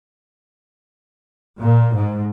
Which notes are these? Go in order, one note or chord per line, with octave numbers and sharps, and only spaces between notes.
A#2
G#2